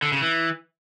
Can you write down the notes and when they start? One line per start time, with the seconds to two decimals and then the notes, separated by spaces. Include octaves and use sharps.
0.02 D3
0.12 C#3
0.21 E3